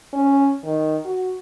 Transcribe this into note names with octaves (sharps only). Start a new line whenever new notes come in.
C#4
D#3
F#4